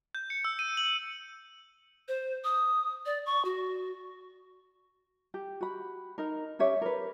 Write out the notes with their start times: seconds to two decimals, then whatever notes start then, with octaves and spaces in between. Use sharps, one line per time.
0.15 G6
0.30 C#7
0.45 E6
0.59 D#7
0.77 F#7
2.08 C5
2.44 D#6
3.06 D5
3.26 C#6
3.45 F#4
5.34 G4
5.61 F#4 B5
6.18 D#4 A#4
6.59 C#4 G4 C#5 E5
6.81 A#4 B4